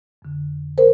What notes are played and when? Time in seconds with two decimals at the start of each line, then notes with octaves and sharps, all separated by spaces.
0.22 F2 D3
0.78 A#4 C5